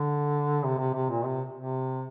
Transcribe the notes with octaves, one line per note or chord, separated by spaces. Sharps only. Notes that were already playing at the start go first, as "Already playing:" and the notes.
Already playing: D3
C3
C3
C3
A#2
C3
C3